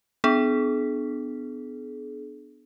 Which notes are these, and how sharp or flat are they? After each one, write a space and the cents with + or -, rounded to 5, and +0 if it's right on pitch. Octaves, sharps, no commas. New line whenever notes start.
B3 +25 D4 +20 G#4 +40